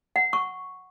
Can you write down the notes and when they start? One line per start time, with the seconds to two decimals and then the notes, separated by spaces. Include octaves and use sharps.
0.16 F#5
0.33 C#6